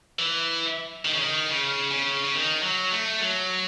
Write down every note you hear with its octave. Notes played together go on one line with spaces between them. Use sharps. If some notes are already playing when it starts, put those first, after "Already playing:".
E3
D#3
C#3
D#3
C#3
C#3
C#3
D#3
F#3
A3
F#3